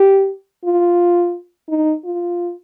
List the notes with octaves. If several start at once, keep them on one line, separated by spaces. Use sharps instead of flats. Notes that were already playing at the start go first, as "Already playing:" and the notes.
Already playing: G4
F4
D#4
F4